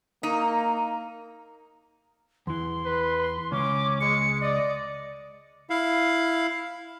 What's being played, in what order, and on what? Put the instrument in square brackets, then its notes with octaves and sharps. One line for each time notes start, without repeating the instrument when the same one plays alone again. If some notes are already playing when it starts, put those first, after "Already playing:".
[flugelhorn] A#3 [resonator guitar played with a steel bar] D#4
[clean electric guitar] E2 E3 [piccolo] C6
[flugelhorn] B4
[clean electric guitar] C#2 [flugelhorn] C#4 [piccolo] D6
[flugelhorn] G#3 [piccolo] C#7
[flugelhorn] D5 [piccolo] D#5
[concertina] E4 F5